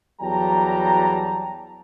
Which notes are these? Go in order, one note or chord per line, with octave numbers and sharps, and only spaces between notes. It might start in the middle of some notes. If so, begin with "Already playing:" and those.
E2 F#3 G3 G5 A5 A#5